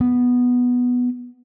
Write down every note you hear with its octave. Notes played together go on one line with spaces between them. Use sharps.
B3